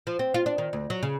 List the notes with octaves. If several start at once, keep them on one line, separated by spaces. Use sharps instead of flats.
F3
C4
F4
D4
D#3
D2
F#3
C#3